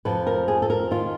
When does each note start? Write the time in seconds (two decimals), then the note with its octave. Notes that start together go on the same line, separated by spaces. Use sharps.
0.05 F2 C3 F3 B4
0.27 A#4
0.48 G#4
0.62 A4
0.70 A#4
0.91 D#3 F4